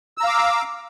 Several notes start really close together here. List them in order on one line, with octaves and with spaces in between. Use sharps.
E6 A#5 F5 D6